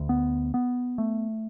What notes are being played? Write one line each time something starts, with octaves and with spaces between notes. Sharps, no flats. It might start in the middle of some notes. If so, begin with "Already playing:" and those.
Already playing: D2
B3
B3
A3